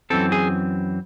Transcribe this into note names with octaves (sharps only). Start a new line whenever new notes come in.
F#2 E3 C4 A4
G#4